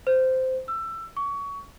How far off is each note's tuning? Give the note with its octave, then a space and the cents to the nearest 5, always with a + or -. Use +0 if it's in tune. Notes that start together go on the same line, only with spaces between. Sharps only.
C5 -10
E6 +20
C#6 +25